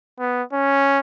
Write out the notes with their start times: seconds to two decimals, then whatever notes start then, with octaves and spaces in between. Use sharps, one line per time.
0.19 B3
0.53 C#4